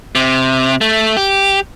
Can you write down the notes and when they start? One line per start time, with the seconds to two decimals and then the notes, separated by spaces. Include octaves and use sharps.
0.15 C3
0.81 A3
1.17 G4